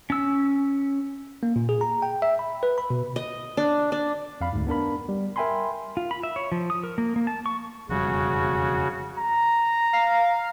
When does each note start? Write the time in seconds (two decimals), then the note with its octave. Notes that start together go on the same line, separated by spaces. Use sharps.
0.10 C#4 E6
1.43 A#3
1.56 A#2
1.69 G#4
1.81 A#5
2.02 G5
2.22 E5
2.39 B5
2.63 B4
2.78 B5
2.90 B2
3.16 D#5
3.57 D4
3.92 D4
4.41 F2 F5 B5
4.53 D2 G#2
4.67 B3 D4 A#4 B5
5.09 G3
5.36 A#4 E5 G5 G#5 B5 C6
5.97 F4
6.11 B5
6.23 E5
6.36 C#5
6.52 F3
6.70 D#6
6.84 A#4
6.98 A#3
7.16 A#3
7.27 A5
7.46 C#6
7.89 E1 F2 C#3 G3 F#4
9.18 A#5
9.93 F5